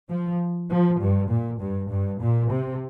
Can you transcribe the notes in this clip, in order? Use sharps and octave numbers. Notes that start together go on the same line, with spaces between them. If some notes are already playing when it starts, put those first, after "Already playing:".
F3
F3
G2
A#2
G2
G2
A#2
C3